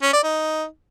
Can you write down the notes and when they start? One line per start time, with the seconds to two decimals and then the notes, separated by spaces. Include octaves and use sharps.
0.02 C#4
0.13 D5
0.23 D#4